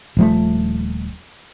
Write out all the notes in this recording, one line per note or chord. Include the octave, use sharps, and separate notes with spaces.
D#1 F3 A3